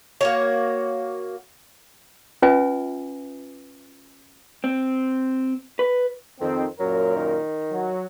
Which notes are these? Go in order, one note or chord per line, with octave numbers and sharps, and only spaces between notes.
A#3 F#4 C#5
C#4 F4 B4 E5 G#5
C4
B4
F2 D#3 C4
F#2 A#2 F#3 A#4
D#3
F#3